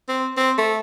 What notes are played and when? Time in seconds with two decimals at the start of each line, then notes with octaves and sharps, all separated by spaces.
0.09 C4
0.37 C4
0.58 A3